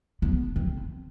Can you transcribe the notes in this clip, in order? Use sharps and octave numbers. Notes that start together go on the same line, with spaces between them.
B3
C4